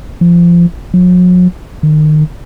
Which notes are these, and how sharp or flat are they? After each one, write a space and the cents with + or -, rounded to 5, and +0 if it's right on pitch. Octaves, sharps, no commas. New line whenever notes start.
F3 -20
F#3 -45
D#3 -30